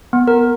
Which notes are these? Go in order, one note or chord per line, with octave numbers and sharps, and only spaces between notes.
B3
A#4